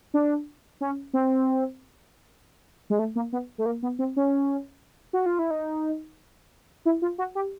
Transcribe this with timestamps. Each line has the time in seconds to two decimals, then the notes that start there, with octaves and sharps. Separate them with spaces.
0.14 D4
0.81 C#4
1.14 C4
2.90 G#3
2.99 A3
3.16 A#3
3.33 B3
3.58 A3
3.66 A#3
3.83 B3
3.99 C4
4.16 C#4
5.13 F#4
5.26 F4
5.39 E4
5.51 D#4
6.85 E4
7.02 F4
7.18 F#4
7.35 G4